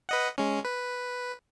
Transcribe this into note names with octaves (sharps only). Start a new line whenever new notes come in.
B4 D#5 F#5
G#3 C#4
B4